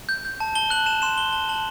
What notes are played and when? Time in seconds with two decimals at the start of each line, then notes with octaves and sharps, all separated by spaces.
0.09 G6
0.25 G6
0.40 A5
0.55 A5 G7
0.70 F#6 F#7
0.86 A5 E7
1.02 C6 E7
1.18 C6 G7
1.33 A5 G7
1.49 A5 F#7